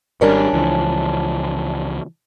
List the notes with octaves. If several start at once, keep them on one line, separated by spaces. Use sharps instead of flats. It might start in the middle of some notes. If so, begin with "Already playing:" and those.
G#1 G3 C#4 D4 A#4
C#2 E3 F3